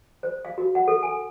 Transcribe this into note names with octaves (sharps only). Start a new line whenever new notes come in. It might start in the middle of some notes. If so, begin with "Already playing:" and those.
C5
F5
F#4
F#5
A4
G#5